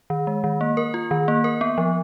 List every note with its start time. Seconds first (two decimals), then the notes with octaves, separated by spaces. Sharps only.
0.10 D#3
0.27 G#3
0.44 D#3
0.61 A#3
0.77 A#4
0.94 F4
1.11 D#3
1.28 A#3
1.44 A#4
1.61 B3
1.78 F3